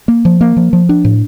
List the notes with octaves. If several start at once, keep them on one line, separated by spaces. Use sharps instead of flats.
A#3
F3
A#3
F3
F3
D4
A2